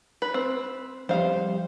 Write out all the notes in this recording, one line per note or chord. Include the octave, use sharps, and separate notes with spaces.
B4
C4
F2 G3 C5 F5